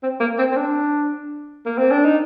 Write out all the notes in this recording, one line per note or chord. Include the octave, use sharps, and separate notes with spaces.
C4
A#3
C4
C4
D4
A#3
C4
D4
D#4